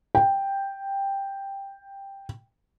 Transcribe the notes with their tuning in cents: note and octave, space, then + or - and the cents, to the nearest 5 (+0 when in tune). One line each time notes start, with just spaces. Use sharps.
G5 +5